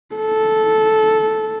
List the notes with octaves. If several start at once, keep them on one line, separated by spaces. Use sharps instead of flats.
A4